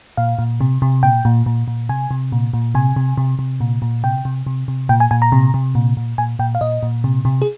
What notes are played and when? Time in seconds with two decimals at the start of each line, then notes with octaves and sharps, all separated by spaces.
0.17 A#2 F5
0.39 A#2
0.61 C3
0.82 C3
1.03 A#2 G5
1.25 A#2
1.46 A#2
1.68 A#2
1.89 C3 G#5
2.11 C3
2.32 A#2
2.54 A#2
2.75 C3 G#5
2.96 C3
3.17 C3
3.39 C3
3.60 A#2
3.82 A#2
4.04 C3 G5
4.25 C3
4.47 C3
4.68 C3
4.89 A#2 G5
5.00 G#5
5.11 A#2 G#5
5.22 A#5
5.32 C3
5.54 C3
5.75 A#2
5.97 A#2
6.18 A#2 G#5
6.39 A#2 G5
6.55 F5
6.61 A#2 D#5
6.83 A#2
7.04 C3
7.25 C3
7.42 G#4